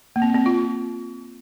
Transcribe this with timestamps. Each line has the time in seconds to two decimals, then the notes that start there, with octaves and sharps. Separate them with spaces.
0.16 A#3
0.22 C4
0.34 C4
0.46 F4